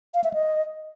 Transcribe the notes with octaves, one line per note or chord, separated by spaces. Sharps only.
F5
E5
D#5